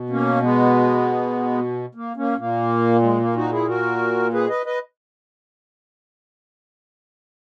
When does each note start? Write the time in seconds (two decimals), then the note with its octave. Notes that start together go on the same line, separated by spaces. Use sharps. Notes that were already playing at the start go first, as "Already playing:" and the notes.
Already playing: B2
0.10 A#3 C#4
0.42 G#3 B3
1.95 A#3
2.16 A#3 C#4
2.38 A#2 A#3
3.03 G#3
3.20 A#3
3.36 D#4 F#4
3.52 E4 G#4
3.68 F#4 A#4
4.33 G#4 B4
4.49 B4 D#5
4.66 B4 D#5